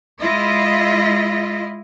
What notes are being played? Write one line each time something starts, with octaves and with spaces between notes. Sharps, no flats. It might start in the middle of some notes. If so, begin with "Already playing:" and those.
G#3 E4 F4 D#5